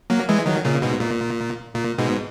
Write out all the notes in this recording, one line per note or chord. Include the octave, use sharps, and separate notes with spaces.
F#3 A#3
E3 G#3
D#3 F#3
A#2 C#3
G#2 B2
A#2
A#2
G#2 B2